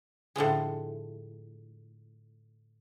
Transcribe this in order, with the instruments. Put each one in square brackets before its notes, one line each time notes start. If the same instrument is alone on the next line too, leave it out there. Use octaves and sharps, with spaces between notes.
[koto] A2 D3 F3 G#3